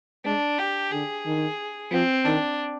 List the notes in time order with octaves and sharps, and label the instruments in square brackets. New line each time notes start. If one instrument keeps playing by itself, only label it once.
[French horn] G#3 [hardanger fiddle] D4
[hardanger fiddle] G4
[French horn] D3 [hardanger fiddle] G#4
[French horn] D#3
[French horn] F3 [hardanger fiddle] C4
[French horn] D#3 [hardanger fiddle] D4